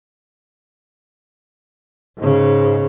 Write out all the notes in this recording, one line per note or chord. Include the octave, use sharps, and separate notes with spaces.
G#2 C#3